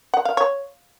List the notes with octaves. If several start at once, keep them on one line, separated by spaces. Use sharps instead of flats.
F#5
F5
C#5